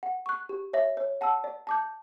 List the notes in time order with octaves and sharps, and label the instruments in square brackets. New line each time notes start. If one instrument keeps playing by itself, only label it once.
[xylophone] F#5
C#6 F#6
G4
C#5 E5
C#5
F#5 A5 E6
D5
A5 D6 G6